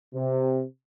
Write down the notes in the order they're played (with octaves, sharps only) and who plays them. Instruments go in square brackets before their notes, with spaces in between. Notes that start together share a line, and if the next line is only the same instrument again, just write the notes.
[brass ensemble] C3